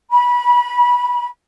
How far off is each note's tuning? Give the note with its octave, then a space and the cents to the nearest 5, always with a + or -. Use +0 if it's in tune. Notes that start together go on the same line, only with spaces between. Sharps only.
B5 -25